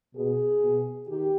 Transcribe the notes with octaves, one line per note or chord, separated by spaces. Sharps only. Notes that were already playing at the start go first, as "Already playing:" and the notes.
B2 G#4
B2
D#3 G4